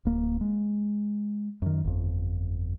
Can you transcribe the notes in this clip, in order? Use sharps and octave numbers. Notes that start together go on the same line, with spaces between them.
D1 A#3
G#3
F#2 D#3
G1 F2